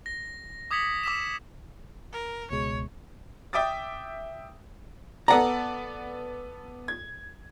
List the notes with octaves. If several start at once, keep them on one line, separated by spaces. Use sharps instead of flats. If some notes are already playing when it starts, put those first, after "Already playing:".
A#6
D6 D#6 G#6 B6 C#7 F#7
D6 E6 B6 E7
A#4
C#2 B2 G#3 C#5
E5 G5 D6 D#6 A6
B3 A4 D5 F#5 A#5
G#6